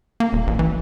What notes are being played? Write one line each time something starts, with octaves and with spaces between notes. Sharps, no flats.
A#3
D#1
A1
E3